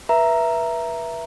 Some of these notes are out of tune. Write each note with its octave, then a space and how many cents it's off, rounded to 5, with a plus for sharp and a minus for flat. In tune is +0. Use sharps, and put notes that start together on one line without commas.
B4 -30 E5 +10 A#5 +0